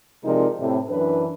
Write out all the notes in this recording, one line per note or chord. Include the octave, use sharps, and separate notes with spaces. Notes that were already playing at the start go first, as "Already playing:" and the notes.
C3 F3 G#3 D#4 A#4 D5
A2 C3
F#2 E3 D4 B4